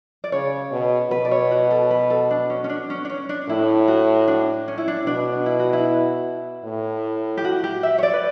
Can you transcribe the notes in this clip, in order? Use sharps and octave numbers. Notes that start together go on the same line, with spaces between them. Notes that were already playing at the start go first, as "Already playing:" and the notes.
D5
C#3 C#5
B2
B2 B4
D5
C#5
F#4
A4
B4
A4
D4
C#4
C#4
D4
C#4
D4
C#4
D4
A2 E4
F#4
D4
C#4
E4
D4
B2 D4
E4
F#4
E4
A2
G4
F#4
G4
E5
C#5
D5
B4